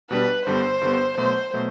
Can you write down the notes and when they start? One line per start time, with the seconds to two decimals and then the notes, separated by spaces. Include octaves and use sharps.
0.11 B2 G3 D4 B4
0.46 G2 D3 G3 B3 C5
0.81 G2 D3 G3 B3
1.17 B2 F#3 A3 C5
1.54 B2 F#3 A3